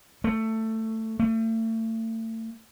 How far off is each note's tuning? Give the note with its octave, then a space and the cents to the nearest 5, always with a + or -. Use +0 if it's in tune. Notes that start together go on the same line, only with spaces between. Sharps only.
A3 +15
A3 +35